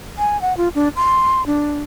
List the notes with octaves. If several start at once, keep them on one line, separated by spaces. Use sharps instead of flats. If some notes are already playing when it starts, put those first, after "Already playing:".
G#5
F#5
F4
D4
C6
D4